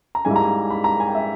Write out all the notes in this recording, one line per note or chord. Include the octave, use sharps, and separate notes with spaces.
A#5
G#2 G3 A#3 E4 G#5
A#5
B5
A#5
G#5
G5
E5